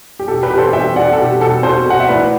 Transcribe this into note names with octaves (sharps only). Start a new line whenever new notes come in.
G4
B2 A4
G4 B4
B2
A4 C5
B2 E5 G5
B2 D5 F#5
A4
B2 G4
B2 A4
B2 A4 C5
B2 F#5
E5
A2 B4 D5